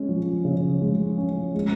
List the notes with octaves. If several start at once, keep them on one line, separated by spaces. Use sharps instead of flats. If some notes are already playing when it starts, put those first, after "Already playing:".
Already playing: G#3 C#4
F3
C#3
G#3
C#4
G#3